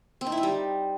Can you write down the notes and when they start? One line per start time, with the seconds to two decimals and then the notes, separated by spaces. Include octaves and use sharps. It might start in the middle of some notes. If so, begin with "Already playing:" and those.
0.21 C4
0.27 D#4
0.32 E4
0.38 D#4
0.43 G3